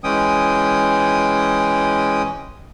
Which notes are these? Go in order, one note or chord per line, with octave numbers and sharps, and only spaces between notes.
E3 G#3 C#4 G5 D#6